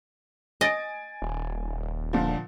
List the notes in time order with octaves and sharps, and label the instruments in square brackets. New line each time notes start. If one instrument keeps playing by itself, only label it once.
[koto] D#5 [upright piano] G#5 A6 D7
[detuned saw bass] D#1
[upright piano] A#2 D3 F3